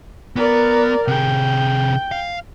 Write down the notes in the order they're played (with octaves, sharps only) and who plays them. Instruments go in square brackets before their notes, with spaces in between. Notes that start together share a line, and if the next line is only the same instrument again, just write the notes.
[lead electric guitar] B3 [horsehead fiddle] A#4 D5
[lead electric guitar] C3 G#4 [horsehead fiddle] G5
[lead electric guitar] F5